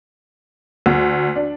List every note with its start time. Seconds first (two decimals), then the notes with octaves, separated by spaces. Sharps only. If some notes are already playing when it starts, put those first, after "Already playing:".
0.86 D2
1.36 D4